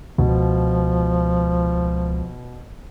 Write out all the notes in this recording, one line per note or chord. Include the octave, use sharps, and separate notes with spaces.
C#2 B2 F3